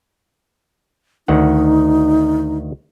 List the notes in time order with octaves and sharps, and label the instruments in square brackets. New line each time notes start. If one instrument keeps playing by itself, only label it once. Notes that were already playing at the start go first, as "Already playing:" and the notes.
[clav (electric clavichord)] D2 D#3 F#5 [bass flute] D#4